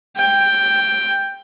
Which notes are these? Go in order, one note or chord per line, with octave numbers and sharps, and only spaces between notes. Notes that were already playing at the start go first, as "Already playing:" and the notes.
G5